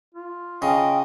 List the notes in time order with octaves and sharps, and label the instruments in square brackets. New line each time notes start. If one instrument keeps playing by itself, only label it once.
[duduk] F4
[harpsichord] C#3 [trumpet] D#5 [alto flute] G5